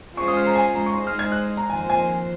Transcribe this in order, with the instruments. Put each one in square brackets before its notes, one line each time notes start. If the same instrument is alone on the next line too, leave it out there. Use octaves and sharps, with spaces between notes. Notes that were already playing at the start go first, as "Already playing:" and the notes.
[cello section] G#3 C#4 F4 G#4 C5 [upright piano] C#6
[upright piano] D#6
F6
A#5
G#5
A#5
C#6
[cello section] G#3 D#4 G#4 C5 [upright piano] C6
[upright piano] F6
G#6
F#6
A#5
[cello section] F2 D#3 A#3 F4 C5 [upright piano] G#5
[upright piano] G#5